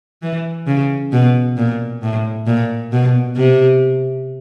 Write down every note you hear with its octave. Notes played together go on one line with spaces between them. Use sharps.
E3
C#3
B2
A#2
A2
A#2
B2
C3